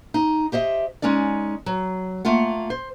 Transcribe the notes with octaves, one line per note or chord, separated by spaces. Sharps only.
D#4
G4 C5 D#5 E5
G#3 C#4 D#4 D5
F#3
A3 A#3 F4 F#5
C5